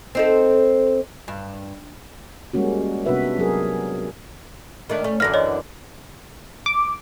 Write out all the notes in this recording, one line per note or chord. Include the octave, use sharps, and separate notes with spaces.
C4 D#4 A4
G2
G3 G#3 A#3 C#4 F#4
C3 B3 D4 F#4 B4 E5
F#3 G#4 A#4
D#3 A3 D4
A3 C#4
F#2 D3 E3 F6 A#6
C#5 D#5
D6